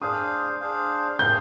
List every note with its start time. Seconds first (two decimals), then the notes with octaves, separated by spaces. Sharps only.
0.01 D4 G#4 C5 F5 D#6
0.61 D4 G#4 C5 F5
1.19 D4 G#4 C5 F5 G6